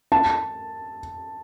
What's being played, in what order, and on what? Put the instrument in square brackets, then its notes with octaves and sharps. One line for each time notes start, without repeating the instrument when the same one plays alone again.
[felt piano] A5